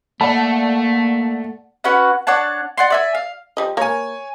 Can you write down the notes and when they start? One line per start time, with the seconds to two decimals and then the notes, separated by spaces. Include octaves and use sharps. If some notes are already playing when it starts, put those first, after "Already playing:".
0.21 A3 A#3 D5 F#5 A5
1.84 C#4 F#4 B4 F#5
2.27 D4 C#5 F#5 A5
2.78 D5 F#5 C6
2.90 D5 E5 G#5
3.15 F5
3.57 F3 G3 D#5
3.77 A#3 A#4 C#5 G#5